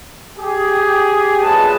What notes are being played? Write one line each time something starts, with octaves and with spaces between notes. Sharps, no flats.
G4 G#4
B1 A#2 G#3 G#4 B4 A5